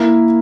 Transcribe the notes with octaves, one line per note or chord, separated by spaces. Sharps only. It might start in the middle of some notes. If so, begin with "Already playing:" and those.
Already playing: A#3 E4 A#4